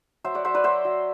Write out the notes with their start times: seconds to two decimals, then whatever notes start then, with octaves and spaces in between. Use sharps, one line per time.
0.24 F#3 C5 E5
0.35 D5 F#5
0.44 F#3 C5 E5
0.54 B4 D5
0.64 F#3 C5 E5
0.85 F#3